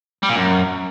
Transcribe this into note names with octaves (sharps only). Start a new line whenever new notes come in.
G3
A#2
F#2